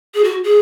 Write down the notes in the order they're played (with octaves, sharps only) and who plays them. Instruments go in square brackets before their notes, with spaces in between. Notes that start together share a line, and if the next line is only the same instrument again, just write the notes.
[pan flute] G#4
F#4
G#4